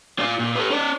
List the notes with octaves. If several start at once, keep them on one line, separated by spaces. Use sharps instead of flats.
F4 D5
A#2
A4 B4
C#4 D5